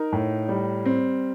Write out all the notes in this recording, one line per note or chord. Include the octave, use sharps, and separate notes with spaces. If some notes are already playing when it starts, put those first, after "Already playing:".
Already playing: D#4 A#4
A2
G3
C4